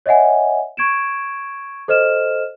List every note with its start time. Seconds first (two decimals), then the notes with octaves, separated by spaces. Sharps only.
0.06 C#5 D#5 E5 F#5 G#5
0.77 C#6 G#6 D7 E7
1.88 A4 C5 D#5 F6 E7